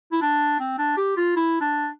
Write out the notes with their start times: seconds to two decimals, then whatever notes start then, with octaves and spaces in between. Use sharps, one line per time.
0.12 E4
0.22 D4
0.60 C4
0.78 D4
0.97 G4
1.17 F4
1.36 E4
1.61 D4